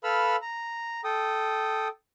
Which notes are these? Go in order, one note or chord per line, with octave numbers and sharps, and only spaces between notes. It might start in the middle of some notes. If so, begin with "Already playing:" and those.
A4 B4 F5 B5 E6 F6
A#5
A4 G5 D#6